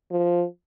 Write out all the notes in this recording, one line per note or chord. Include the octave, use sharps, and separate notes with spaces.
F3